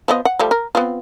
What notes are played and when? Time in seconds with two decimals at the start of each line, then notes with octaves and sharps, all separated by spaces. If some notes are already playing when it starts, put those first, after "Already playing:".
0.08 F3 B3 D#5
0.25 F#5
0.39 F3 G3 A3
0.51 A#4
0.75 B3 C4 F4